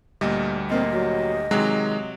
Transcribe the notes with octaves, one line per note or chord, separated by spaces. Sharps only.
D2 A#2 G3 D#5
A#2 A#3 C4 D#5
F#3
C3 D#3 F#3 G#3